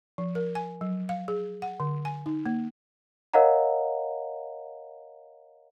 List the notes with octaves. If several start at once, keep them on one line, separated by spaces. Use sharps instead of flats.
F3
A#4
G#5
F#3
F5
G#4
F#5
D3
G#5
D#4
A#3
A#4 C#5 D#5 F5 F#5 A#5